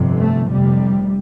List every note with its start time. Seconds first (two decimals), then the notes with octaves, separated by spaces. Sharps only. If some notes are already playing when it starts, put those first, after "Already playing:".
Already playing: G1 F2 C3
0.18 A3
0.50 F1 F2 C3 G3